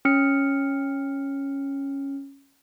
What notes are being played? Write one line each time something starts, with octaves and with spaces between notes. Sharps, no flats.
C#4 F6 C#7